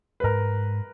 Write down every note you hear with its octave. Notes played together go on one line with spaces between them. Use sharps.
B4
G#2 A#4